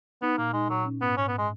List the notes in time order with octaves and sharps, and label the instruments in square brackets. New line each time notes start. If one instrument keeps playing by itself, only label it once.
[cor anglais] B3 [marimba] D#4
[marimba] A#2 [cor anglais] A#3
[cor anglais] G#3 [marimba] D#4
[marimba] A#2 [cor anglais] F#3
[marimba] C#4
[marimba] G#2 [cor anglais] B3
[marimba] G#2 [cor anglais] C#4
[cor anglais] B3
G#3